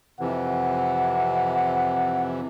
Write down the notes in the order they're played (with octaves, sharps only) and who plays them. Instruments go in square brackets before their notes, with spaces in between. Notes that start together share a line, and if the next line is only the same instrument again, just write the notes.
[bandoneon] F2 C3 E3 [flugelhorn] F#5